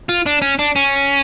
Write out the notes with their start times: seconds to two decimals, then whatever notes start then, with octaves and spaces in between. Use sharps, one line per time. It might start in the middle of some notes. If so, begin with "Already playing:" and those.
0.09 F4
0.26 D4
0.42 C#4
0.59 D4
0.76 C#4